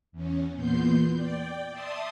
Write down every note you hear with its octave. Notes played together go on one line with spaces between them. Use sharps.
E2 C#4
E2 A#2 B3 C6 G6
D5 G5
D5 E5 A5 C6 D#6